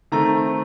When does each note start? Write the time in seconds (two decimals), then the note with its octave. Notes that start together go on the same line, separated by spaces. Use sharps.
0.12 D#3 A3 C4 A#5